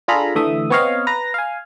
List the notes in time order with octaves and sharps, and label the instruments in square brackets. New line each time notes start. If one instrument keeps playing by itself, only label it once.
[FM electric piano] D4 F4 G#4 A4 A#5 B5
D3 E3 A3 E5 D#6
B3 C4 C#5 D#5 F5
B4 A#5 A#6
F5 G#5